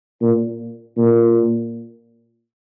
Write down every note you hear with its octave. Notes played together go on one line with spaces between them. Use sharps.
A#2
A#2